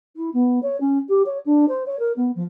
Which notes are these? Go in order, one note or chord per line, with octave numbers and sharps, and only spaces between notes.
E4
B3
C#5
C#4
G4
C#5
D4
C5
C#5
A#4
B3
F3